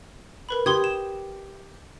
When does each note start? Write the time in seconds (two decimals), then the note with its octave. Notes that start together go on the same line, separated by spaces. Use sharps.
0.49 A#4 B4 B5
0.66 G4 C6 D#6 G#6
0.84 E7